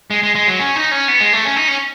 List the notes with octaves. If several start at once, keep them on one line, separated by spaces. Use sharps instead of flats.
G#3
G#3
G#3
F#3
C#4
D#4
C#4
B3
G#3
A3
C#4
D#4
C#4